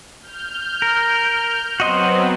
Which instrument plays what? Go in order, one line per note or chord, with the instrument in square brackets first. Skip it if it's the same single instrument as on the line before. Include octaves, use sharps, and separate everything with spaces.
[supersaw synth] F6 G6
[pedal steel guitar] A#4
[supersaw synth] F#3 B3 C4 [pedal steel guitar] F#4 D#5 C6